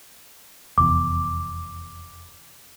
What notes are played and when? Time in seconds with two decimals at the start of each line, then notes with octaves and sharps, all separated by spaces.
0.78 F1 E2 D6